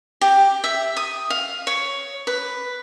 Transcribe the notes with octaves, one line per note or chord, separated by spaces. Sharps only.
G4
E5
D#6
F5
C#5
B4